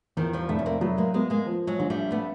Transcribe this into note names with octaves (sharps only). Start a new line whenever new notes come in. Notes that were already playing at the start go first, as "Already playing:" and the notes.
E2 D#3 F3
F3 G3
F1 A3 B3
C#4
A#3 C4
F#3 A3 B3
G#3 A#3
G#3 A#3 B3
G#3 A#3
F3
F#3 G#3
A#1 G#3
G3 A3
A3 B3